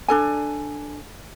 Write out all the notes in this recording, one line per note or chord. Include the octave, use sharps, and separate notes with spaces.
D4 A4 G#5